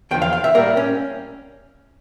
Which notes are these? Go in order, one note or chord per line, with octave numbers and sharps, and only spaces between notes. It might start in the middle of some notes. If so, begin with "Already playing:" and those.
E2 D3 F3 G5
F5
F5
E5
A2 G3 A#3 A#4
C#4